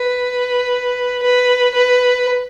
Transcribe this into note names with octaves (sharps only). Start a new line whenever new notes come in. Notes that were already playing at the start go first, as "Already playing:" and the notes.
Already playing: B4
B4
B4